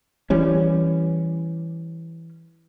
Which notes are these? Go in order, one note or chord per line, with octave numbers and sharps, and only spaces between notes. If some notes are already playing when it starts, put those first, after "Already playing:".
E3 G3 C#4